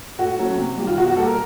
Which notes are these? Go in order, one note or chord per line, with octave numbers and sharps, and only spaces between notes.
A2 F#4
F#3 A3 C#4
C3
D#3 G3
F4
B2 F#4
F#4
G3 A#3 A4
A#4